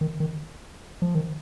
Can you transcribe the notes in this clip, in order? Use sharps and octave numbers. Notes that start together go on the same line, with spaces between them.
D#3
D#3
F3
D#3